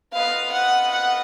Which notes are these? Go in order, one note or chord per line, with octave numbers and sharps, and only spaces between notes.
B3 F4 B4 D#5 F5
F#5
F#5